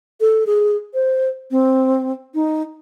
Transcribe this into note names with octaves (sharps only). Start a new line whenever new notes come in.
A4
G#4
C5
C4
D#4